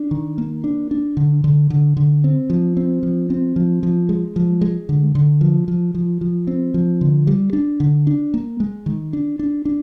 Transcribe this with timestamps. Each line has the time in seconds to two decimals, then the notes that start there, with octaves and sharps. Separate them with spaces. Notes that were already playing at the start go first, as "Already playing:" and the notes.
Already playing: D4
0.11 D#3
0.38 A#3
0.64 D4
0.91 D4
1.17 D3
1.44 D3
1.70 D3
1.97 D3
2.24 C4
2.50 F3
2.77 C4
3.03 F3
3.30 C4
3.56 F3
3.83 F3
4.09 G#3
4.36 F3
4.61 G#3
4.89 D3
5.15 D3
5.41 F3
5.68 F3
5.95 F3
6.21 F3
6.47 C4
6.74 F3
7.01 D3
7.27 G3
7.53 D4
7.80 D3
8.07 D4
8.34 A#3
8.60 G#3
8.86 D#3
9.13 D4
9.39 D4
9.65 D4